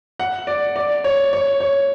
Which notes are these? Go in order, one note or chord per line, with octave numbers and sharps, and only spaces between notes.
F#5
D5
D5
C#5
C#5
C#5